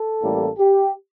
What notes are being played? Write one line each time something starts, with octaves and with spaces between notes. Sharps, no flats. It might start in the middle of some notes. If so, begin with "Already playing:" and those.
Already playing: A4
A1 A2 G3 A#3
G4